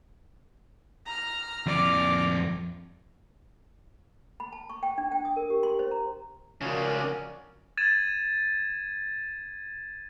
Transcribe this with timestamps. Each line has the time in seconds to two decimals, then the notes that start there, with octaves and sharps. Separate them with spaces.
1.06 A#5 F6
1.66 F2 D5 D6 F6
4.40 B5
4.53 A5
4.70 C#6
4.83 G5
4.98 D4
5.12 G5
5.25 D#6
5.36 A#4
5.50 G4
5.63 C6
5.79 C5
5.91 A#5
6.61 C#3 F3 C#4 F#4 A#4 D5
7.77 G#6 A6 D#7 E7